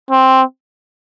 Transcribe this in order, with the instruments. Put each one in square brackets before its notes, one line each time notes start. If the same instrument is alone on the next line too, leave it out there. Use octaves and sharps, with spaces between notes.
[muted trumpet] C4